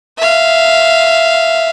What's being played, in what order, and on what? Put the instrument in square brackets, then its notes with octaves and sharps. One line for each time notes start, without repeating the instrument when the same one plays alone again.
[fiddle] E5 F5